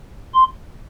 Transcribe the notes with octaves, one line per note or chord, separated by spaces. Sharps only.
C6